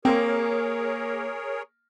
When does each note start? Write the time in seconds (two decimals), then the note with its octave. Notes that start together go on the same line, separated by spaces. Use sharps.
0.05 A#3 C4 G#4 A#4 C#5